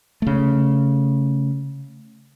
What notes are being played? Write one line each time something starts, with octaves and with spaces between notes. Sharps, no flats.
C#3 A3